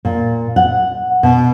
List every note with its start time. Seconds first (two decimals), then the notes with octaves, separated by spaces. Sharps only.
0.05 A#2
0.56 F#5
1.23 B2